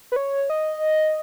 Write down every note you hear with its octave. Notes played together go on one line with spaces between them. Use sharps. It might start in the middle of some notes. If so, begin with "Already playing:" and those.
B4
C#5
D#5